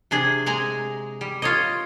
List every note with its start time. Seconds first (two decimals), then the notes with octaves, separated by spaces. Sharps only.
0.11 C3 D4 G#4
0.46 G#3 G#5 A#5
1.21 G3
1.42 F4 C#5 D#5